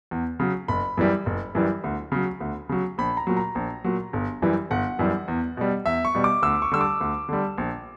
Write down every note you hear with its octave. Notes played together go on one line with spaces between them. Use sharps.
E2
C#3 F#3
F#1 B5
F#2 E3 G3
F#1
F#2 E3 G3
D2
C#3 F#3
D2
C#3 F#3
A#1 B5
A#5
A#2 F#3
A#5
A#1
A#2 F#3
G1
F#2 E3 G3
G1 F#5
F#2 E3 G3
E2
B2 G3
E2 E5
C#6
B2 G3
D6
D2 E6
C#6
D3 G3 E6
D6
D2
D3 G3
A#1